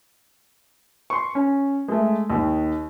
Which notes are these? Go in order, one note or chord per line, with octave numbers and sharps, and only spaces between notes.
C6 C#6
C#4
G#3 A3
D#2 D#3